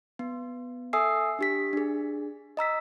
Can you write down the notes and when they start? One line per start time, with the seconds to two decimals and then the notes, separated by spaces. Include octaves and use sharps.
0.19 B3
0.93 A4 E5 G#5 D#6 E6 C7
1.39 D4 G4 B6
1.73 D4 G#4
2.57 D#5 A#5 E6 B6